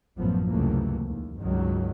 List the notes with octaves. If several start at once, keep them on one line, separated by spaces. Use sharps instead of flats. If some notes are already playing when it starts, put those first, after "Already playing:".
A1 F#2 F3 A3 B3
C#2 F#2 C3 E3 A3 A#3
D#2
C#2 G2 D#3 F#3